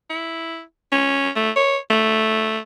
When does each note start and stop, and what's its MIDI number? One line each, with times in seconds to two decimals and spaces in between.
0.10 0.62 64
0.92 1.30 61
1.36 1.51 57
1.56 1.77 73
1.90 2.59 57